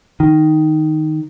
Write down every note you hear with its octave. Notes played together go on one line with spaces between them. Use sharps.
D#3